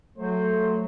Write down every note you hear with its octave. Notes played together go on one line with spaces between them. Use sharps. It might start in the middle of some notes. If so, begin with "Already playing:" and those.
F#3 A3 C5